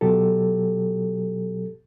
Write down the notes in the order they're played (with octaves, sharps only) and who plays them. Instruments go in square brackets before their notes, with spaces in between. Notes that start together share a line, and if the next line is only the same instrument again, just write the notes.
[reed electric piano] B2 F#3 G4 A4